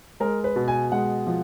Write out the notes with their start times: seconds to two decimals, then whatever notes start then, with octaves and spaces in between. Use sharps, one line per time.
0.20 G#3 A#4
0.44 B4
0.56 B2
0.68 G#5
0.92 G#3 F#5
1.27 F3